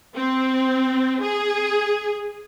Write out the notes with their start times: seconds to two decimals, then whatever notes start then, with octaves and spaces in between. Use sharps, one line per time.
0.16 C4
1.23 G#4